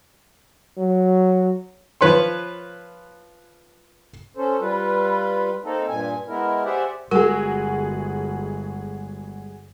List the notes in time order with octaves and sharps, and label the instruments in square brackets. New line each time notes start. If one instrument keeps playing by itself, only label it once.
[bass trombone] F#3
[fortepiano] F3 B4 C#5 C6
[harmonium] C#4 A4 C5
G3 F4 B4
A#3 C4 D#4 A4
G2 A#2 G#5
G#3 B3 E4 A#4
G4 G#4 C5 D5 E5 F#5
[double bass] G1 [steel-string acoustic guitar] G3 G#3 [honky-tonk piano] F#4 G#4 [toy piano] A#4